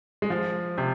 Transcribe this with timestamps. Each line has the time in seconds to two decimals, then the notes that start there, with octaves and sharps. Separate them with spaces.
0.22 G#3
0.30 F3
0.78 C3